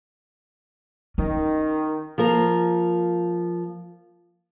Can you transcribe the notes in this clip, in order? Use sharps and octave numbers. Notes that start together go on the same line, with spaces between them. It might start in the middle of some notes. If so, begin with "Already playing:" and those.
D#3 C#4
F3 A#3 A#4